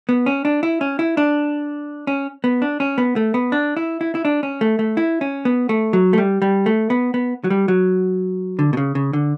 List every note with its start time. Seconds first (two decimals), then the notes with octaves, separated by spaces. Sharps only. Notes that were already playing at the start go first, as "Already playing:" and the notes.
0.09 B3
0.26 C#4
0.45 D4
0.63 E4
0.81 C#4
0.99 E4
1.17 D4
2.07 C#4
2.44 B3
2.62 D4
2.80 C#4
2.98 B3
3.16 A3
3.34 B3
3.52 D4
3.77 E4
4.01 E4
4.15 E4
4.25 D4
4.43 C#4
4.61 A3
4.79 A3
4.97 E4
5.21 C#4
5.45 B3
5.69 A3
5.93 F#3
6.13 A3
6.18 G3
6.42 G3
6.66 A3
6.90 B3
7.14 B3
7.44 F#3
7.50 G3
7.68 F#3
8.59 D3
8.73 B2
8.77 C#3
8.95 C#3
9.13 D3